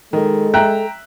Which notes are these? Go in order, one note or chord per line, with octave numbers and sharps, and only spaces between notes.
D#3 G#3 A4
E5 G5 A#5 F#6